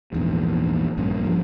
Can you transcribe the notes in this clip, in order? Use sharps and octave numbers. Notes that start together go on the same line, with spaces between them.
A#1 E2 G#2
A#1 G2 A#3 C#4
G2 F3